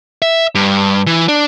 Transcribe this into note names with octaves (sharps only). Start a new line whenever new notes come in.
E5
G2
E3
D4